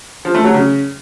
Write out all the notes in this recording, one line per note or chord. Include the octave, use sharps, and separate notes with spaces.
F3
A3
F#3
C#3